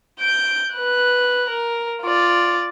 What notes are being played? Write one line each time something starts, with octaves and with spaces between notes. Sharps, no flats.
G6 D7
B4 F#6
A#4
F4 D5